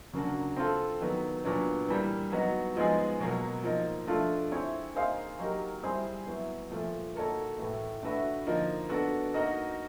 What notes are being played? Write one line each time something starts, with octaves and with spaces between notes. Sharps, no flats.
C#3 F#3 A#3 D4 F#4
C4 F4 A4
D#3 F#3 B3
A#2 F#3 B3 D4
E3 G3 A#3
F#3 B3 D#4 F#4
F3 G#3 B3 D#4 G#4
B2 F#3 A#3
F3 A#3 D#4
F3 A3 D4 F4 A4
C4 E4 G#4 C#5
A#3 D#4 G#4 C5 F5
F#3 A#3 D#4 G4 A#4
G3 C4 E4 G#4 C5
F#3 B3 E4
A#2 F3 A3
A#3 D#4 F#4 A4 C#5
A2 E3 A3
A3 D4 F#4 B4 E5
D3 F3 A#3 D#4
B3 D4 F#4 A4
A#3 D#4 F#4 A#4 D#5